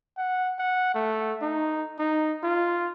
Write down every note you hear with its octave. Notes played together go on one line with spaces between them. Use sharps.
F#5
F#5
A3
D#4
D#4
F4